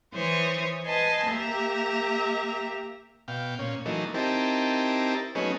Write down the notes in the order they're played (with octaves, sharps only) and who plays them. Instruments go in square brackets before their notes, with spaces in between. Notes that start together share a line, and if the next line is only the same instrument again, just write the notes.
[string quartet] E3 C5 C#5 D#6
B4 D#5 G#5 A5 C6
A#3 G4 E5 A#5
[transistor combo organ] B2 F5 G5
A#2 C#4
E3 F#3 A3 A#3 D#4
C4 D#4 E4 G4 A#4 A5
F#3 A3 B3 C#4 D#4 G#4